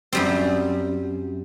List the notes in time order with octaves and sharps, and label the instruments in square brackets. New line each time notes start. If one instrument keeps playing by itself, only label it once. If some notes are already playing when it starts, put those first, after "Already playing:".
[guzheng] F#2 G3 C4